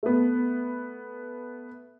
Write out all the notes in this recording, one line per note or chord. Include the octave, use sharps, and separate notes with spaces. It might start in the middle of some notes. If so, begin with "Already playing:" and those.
A3 B3